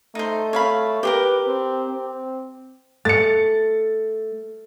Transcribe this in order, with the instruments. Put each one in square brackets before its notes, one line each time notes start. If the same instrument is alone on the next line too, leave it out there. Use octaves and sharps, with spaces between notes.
[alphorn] A3 [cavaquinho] D#4 C5
[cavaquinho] C#5 F5 B5
[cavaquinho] G4 G#4 A#4 [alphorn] B4
[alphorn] C4
C4
[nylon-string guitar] A3 [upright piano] A6 C#7